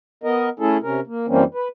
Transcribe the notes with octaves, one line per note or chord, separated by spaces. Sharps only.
B3 A#4 D#5
A3 C#4 E4 G#4 A4
C3 C#4 A#4
A#3
F#2 E3 G3 A#3 C4 C#4
B4